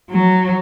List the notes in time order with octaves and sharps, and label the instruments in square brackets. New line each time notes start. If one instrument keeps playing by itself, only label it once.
[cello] F#3